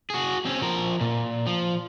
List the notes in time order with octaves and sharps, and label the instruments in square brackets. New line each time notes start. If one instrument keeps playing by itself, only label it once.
[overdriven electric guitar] F#4 G#4
C4 C#4
F3 A#4
A#2
F3